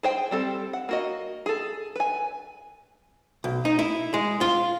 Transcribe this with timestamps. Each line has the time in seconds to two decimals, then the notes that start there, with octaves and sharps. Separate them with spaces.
0.03 G#4 C5 G5
0.31 G3 C4 A4
0.73 F#5
0.89 A#3 F#4 D#5
1.46 G#4 A4
1.95 B4 G#5
3.44 B1
3.65 D#4
3.79 E4
4.14 G#3
4.41 F4